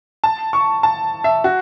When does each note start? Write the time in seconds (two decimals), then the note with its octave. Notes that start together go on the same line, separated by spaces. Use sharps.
0.24 A5
0.53 C#6
0.83 A5
1.24 E5
1.44 F#4